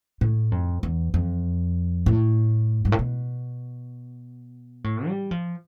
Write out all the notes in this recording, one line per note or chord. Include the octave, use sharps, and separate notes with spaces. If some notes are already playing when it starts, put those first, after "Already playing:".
A2
F2
E2
F2
A2
G2
A2
B2
A2
G3
F3